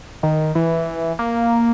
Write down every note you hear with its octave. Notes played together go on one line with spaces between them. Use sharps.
D#3
E3
A#3